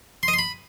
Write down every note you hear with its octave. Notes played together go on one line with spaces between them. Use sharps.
C6
D#5
C6
B5